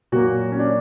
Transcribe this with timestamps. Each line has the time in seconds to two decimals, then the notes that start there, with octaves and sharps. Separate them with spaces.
0.12 A#2 F#3 A#3 F#4
0.52 C#4
0.59 D4